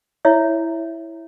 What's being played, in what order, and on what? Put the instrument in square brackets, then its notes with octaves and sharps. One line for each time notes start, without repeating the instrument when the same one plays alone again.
[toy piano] E4 C#5 E5